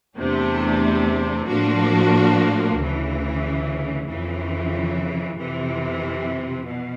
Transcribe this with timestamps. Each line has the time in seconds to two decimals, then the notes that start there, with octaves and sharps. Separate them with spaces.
0.18 E2 C3 E3 A3 D4
1.48 A2 F3 A#3 D4 F#4
2.77 D2 C#3 E3
4.07 F2 C#3 E3
5.37 F2 C3 E3
6.66 B2